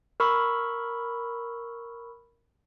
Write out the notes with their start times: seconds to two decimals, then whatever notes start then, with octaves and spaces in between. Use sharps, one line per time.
0.20 A#4 B5 C#6 E6